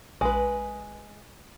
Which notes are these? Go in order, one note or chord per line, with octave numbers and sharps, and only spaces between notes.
A#1 G#3 B4